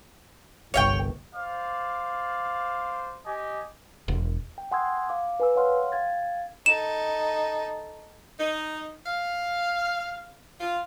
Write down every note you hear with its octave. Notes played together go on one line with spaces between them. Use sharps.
G1 C2 C#5 E5 G5
C5 D5 F5
G4 D#5 G#5
E1
G5
F#5 G#5 C6 D#6 E6 G#6
F5 D6
B4 G#5 E6
C#5 F5 F#5 C6 F6
F5 G5 G#6 A6
D#4 A4 E7
D#4
F5
F4